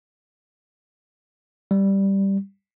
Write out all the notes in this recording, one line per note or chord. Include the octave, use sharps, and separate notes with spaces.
G3